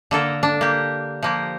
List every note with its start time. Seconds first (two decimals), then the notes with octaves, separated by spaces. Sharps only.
0.11 D3 A#3 A4 A#4
0.43 D4
0.61 A#3 G4
1.23 F3 A#3 G4